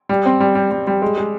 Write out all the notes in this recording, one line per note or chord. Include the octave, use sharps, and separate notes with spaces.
G3
C4
G3
G3
G3
G3
G#3
G#3